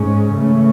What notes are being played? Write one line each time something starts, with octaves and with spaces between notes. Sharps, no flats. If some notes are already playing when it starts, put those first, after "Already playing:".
Already playing: G#2 G#3 C#4
C#3 E3 A3 C#4